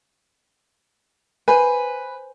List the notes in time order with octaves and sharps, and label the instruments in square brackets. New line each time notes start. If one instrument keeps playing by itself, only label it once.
[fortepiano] B4 [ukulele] C5 G#5